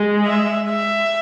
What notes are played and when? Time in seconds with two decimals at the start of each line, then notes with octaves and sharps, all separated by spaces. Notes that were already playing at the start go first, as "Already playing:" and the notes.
Already playing: G#3
0.26 E5
0.69 E5